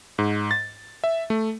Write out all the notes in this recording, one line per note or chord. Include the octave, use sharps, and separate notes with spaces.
G#2
A6
E5
A3